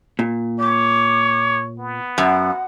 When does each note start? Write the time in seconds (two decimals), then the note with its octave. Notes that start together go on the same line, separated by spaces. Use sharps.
0.19 A#2
0.60 C#5 D6
1.79 B3
2.18 F#2 F#5